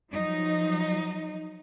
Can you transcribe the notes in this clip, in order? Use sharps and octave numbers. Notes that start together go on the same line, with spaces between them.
F3 F#3 D#4